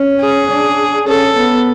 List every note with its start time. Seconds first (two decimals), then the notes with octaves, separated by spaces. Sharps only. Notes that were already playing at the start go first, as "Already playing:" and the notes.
Already playing: C#4
0.21 G#4
0.50 D4
1.07 C#4 A4
1.36 B3